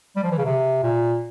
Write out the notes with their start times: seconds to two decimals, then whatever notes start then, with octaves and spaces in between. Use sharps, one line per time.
0.16 G3
0.24 F3
0.31 E3
0.38 C#3
0.45 C3
0.83 A#2